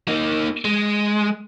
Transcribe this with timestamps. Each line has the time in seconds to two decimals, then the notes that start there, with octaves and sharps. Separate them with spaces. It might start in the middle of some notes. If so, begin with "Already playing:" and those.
0.08 A#3 D#4
0.65 G#3